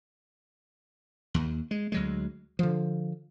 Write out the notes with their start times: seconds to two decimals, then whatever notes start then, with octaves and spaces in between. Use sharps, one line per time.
1.34 D#2
1.71 G#3
1.92 D2 F#3 G#3
2.59 D3 F3